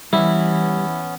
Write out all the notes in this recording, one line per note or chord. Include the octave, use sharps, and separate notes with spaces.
E3 G3 B3 C#4 E4